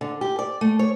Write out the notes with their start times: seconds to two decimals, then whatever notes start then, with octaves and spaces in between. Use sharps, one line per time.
0.01 D3
0.21 G4
0.39 D5
0.61 A3
0.79 C#5